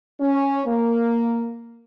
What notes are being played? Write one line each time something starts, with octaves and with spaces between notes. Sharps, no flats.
C#4
A#3